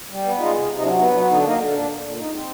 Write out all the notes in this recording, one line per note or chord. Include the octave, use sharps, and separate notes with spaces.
G3
B3
G#3 D#4 F4
C3
C3
D#4
F#3 D4 E4
B3 D#4
F#3 D4
D3 D#4
D4
A#3 D#4
D3
A#2 D4
A#2
A#2
G#2 D#4
C4